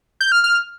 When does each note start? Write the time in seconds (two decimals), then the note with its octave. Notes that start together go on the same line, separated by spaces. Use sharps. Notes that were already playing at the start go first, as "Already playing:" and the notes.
0.21 G6
0.32 F6
0.44 F6